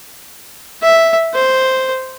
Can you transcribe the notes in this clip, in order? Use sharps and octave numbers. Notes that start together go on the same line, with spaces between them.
E5
C5